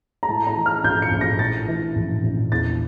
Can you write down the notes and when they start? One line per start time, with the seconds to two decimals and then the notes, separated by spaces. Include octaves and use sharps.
0.23 A#5
0.29 A2 A5
0.47 A#5
0.56 E3
0.66 F6
0.84 A#1 G6
1.02 C#7
1.11 A#1
1.21 A#6
1.39 A2 A6
1.68 E3
1.95 A#1
2.23 A#1
2.51 E2 A6